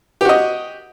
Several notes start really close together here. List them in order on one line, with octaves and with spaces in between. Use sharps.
G4 F#4 D#5